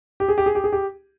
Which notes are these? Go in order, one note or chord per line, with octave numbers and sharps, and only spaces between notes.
G4
G#4
G4
G#4
G4
G#4
G4